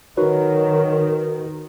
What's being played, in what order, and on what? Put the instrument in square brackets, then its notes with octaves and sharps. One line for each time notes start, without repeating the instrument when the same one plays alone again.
[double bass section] D#3 [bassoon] F#3 [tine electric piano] D#4 F#4 B4 [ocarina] A#4